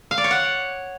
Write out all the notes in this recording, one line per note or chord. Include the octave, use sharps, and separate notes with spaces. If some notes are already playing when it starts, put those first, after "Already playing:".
F5
D5
C#5
F#5